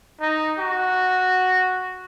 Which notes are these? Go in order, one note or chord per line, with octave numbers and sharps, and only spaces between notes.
D#4
F#4